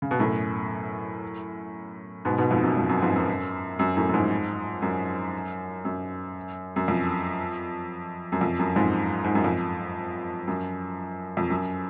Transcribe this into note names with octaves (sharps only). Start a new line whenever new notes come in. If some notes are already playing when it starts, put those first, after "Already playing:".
C#3
B2
F#2 A2
G#2 B2
G#2 B2
F2 G#2
F#2
F2
F#2
F2 G#2
F#2
F#2
F#2 A2
F#2
F2 G#2
F#2
F#2
F#2
F2
F#2
F2
F#2
F2 G#2
G#2
F#2
F2
F#2
F2
F#2